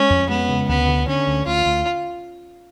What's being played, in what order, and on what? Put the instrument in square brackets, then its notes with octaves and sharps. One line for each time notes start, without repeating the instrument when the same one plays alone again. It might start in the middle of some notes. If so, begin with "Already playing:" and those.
Already playing: [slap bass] G#3 [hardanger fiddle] C#4
[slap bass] F2
[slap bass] G#3 [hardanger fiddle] B3
[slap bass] C#3
[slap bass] D2 [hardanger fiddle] B3
[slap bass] D3
[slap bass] D3 [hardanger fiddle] C#4
[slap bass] D2
[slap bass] D2 [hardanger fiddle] F4
[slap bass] D2